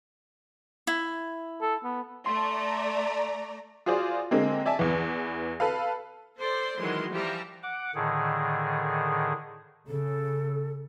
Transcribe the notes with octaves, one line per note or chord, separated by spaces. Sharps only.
E4
A4
B3
A3 D5 A#5 C6
F4 F#4 G#4 C5 D5
D3 G#3 A#3 C4
D5 E5 G#5 A5
E2 E3
A4 B4 F5
A4 C5 D5
D#3 E3 F#3 G#3 C6
E3 F3 G3 G4 E5 A#5
F#5 D6
A2 D3 D#3 G#4
C#3 A4